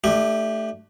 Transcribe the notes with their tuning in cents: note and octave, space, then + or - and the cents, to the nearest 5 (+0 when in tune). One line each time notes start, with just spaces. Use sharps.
A3 +0 D4 +35 G4 +0